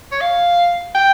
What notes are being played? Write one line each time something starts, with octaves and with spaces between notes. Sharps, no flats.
C#5
F5
G5